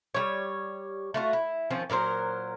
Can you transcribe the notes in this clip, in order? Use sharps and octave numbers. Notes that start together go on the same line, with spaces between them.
G3 C#5
A3 F4 F#4
E4
D#3 F3 C4 C#4
A#2 F#3 A#4 C5